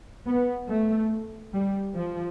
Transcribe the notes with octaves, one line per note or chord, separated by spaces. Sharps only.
B3
A3
G3
F3